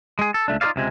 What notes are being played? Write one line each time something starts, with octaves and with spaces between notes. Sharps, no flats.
G#3 G#4
A4
C#2 A3 D4
D#4 F4 A4 B4 D5 F5
C#2 C3 G#3